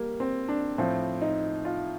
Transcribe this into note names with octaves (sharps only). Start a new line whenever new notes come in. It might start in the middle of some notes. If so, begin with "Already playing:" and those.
Already playing: G3 A#3
C4
D4
A2 F3 C4
D#4
F4